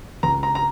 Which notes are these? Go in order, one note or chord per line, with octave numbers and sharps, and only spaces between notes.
C#2 A#5
A#5
A#5